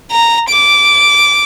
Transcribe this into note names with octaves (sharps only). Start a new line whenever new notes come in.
A#5
D6